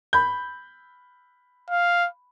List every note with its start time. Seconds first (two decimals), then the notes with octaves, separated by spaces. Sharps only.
0.13 B5 G6
1.70 F5